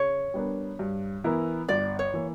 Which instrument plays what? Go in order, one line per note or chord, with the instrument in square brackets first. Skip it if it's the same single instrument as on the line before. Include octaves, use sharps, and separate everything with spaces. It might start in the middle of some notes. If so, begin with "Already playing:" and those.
Already playing: [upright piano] C#3 [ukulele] C#5
[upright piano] G3 B3 D4 A#4
G2
E3 B3 E4 A#4
[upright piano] G1 [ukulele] D5
[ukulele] C#5
[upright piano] E3 A#3